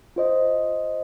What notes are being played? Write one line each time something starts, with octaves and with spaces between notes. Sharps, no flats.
F4 C5 D#5